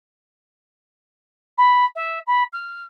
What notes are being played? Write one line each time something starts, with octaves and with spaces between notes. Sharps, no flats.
B5
E5
B5
F6